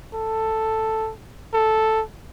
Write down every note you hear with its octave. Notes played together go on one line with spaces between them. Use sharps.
A4
A4